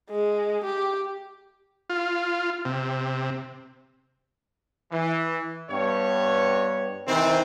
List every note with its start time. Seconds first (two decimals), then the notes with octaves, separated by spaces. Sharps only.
0.10 G#3
0.64 G4
1.90 F4
2.65 C3
4.92 E3
5.70 G2 B3 C#5
7.07 C3 D#3 E3 C4